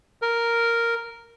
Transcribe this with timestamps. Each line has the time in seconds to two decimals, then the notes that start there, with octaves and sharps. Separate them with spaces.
0.22 A#4